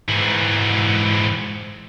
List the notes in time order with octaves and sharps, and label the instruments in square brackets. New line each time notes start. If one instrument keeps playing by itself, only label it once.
[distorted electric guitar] G#2 E3